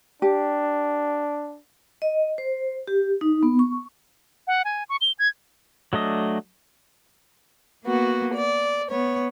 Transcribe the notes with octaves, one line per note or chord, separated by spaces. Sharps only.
D4 G4
D#5
C5
G4
D#4
B3
C#6
F#5
G#5
C#6
G7
G#6
F#3 A3 D4 D#5
A#3 B3 F#4
D5
B3 C#5